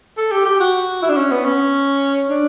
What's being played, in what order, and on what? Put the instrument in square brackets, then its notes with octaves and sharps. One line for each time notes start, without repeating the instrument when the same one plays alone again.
[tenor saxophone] A4
G4
G4
F#4
E4
D4
C#4
B3
C#4
D4